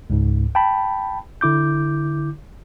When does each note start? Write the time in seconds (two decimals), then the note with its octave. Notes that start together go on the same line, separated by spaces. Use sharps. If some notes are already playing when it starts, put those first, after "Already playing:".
0.10 C#2 G#2
0.55 G5 A5 B5
1.41 D3 E4 D6 G6